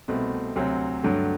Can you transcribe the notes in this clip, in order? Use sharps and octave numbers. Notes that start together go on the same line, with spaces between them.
C2 B2 A3 C4
D2 C3 F#3 C4
G2 D3 F#3 A3